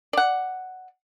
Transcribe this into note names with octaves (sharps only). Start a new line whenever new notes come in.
D5 F#5